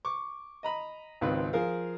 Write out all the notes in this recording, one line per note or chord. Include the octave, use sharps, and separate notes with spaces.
C#6 D6
D#5 A#5 B5
G#1 C#2 D#3 C4 B4
F3 G#4 A#4 F5